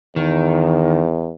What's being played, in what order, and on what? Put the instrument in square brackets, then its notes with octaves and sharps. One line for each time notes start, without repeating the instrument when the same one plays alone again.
[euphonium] E2 [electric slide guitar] D#3